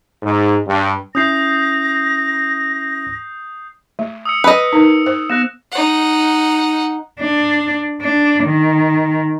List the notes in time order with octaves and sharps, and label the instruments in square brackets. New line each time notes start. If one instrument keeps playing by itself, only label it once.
[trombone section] G#2
G2
[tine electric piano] C#4 E4 [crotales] D#6 G6 C7 [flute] A#6
[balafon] A3
[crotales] D#6 E6 C#7
[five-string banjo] B4 D#5
[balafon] D#4 A#4
C5
[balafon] B3 [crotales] F#6 A#6 E7
[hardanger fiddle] D#4 F#5
[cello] D4
D4
D#3